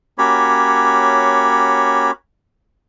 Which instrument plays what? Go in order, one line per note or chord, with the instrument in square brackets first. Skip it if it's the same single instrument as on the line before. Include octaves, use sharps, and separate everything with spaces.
[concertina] A#3 C#4 F#4 G4 C#5 B5